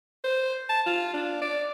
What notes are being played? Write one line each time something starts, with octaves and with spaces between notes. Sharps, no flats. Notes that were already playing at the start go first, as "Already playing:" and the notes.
C5
A5
F4
D4
D5